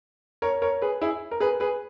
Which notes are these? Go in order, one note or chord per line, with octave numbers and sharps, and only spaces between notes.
A#4 C#5
A#4 C#5
G#4 B4
E4 G#4
A#4
G#4 B4
G#4 B4